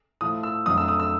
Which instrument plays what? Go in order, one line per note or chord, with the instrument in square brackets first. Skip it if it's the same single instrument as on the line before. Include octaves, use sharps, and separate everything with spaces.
[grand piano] A2 F3 A3 D#6
E6
F2 D3 F#3 A3 D#6
E6
D#6
E6